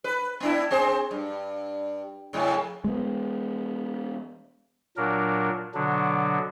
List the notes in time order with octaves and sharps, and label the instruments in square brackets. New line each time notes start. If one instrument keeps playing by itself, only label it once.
[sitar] B4
B3 D4 E4
C4 G#4 C5
G2
F2 A2 C#3
[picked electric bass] G#3 B3
[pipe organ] A#2 F#3 D4 A#4
B2 D3 F#3 D4